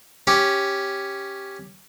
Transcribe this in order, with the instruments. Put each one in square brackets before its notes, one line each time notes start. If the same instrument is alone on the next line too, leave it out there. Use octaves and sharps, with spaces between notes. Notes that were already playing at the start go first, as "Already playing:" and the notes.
[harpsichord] C#4 G4